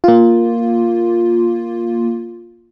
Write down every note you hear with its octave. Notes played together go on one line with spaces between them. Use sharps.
A#3 F4